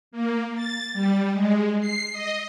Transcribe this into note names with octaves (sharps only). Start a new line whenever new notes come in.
A#3
A6
G3
G#3
C7
D#5